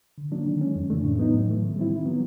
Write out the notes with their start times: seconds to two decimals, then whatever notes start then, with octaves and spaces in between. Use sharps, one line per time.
0.18 D3
0.32 F#3 A#3 D4
0.46 D#3
0.61 G#3 C#4
0.76 F2
0.90 C#3 E3 A3 D4
1.04 A2
1.18 F#3 B3 D#4
1.34 A2
1.48 E3 A3
1.62 D#3
1.76 G3 C4 E4
1.90 D#3
2.06 F#3 B3